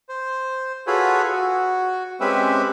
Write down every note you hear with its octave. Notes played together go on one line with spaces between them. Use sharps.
C5
F4 F#4 G#4 A4 B4 C#5
F#4
G#3 C4 C#4 G4 B4 E5